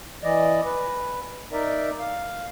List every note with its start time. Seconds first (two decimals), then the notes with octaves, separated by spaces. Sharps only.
0.23 E3 D5 D#5
0.65 B4
1.52 D#4 A#4 D5 E5
1.99 F5